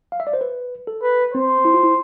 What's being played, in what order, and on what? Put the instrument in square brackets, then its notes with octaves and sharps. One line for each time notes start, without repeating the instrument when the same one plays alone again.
[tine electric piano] F5
E5
D5
C5
B4
A4
[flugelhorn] B4
[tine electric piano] C4 [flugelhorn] C5
[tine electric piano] E4
F4
E4